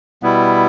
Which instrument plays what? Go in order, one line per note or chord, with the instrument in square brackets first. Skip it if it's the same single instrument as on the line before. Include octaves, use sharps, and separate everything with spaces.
[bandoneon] B2 G3 B3 E4